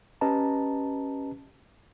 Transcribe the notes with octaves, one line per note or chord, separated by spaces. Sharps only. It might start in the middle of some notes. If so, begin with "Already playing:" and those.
C#4 G4 B4 D#5 A5 A#5